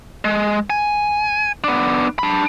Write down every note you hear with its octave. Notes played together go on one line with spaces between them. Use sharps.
G#3
G#5
B3 D4
D4 B5